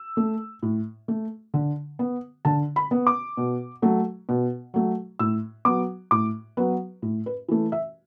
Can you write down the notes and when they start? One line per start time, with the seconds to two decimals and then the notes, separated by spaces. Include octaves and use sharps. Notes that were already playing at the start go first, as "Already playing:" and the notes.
Already playing: E6
0.17 A3
0.63 A2
1.08 A3
1.54 D3
1.99 B3
2.45 D3 A5
2.76 B5
2.91 B3
3.07 D6
3.37 B2
3.82 F#3 A3
4.29 B2
4.74 F#3 A3
5.19 A2 E6
5.65 F#3 B3 D6
6.11 A2 D6
6.57 F#3 B3 B4
7.02 A2
7.26 B4
7.48 E3 A3
7.72 E5